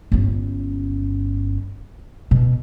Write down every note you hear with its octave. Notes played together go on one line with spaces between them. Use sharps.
G1 C#4
B2